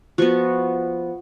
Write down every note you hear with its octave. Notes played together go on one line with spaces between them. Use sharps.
F3 B3 F#4